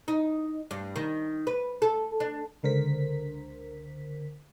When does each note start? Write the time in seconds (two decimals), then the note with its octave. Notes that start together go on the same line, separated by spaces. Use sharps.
0.08 D#4
0.71 G2
0.96 D#3
1.47 B4
1.82 A4
2.20 D4
2.63 C#2 D3 A#4 C5 B6